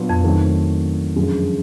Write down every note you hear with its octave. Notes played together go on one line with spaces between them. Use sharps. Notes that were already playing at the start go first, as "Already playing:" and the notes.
Already playing: A#2 F#3 B3 D4 F4
F2
D#3 F#3 A3 C4
F#2 D3 F3 G#3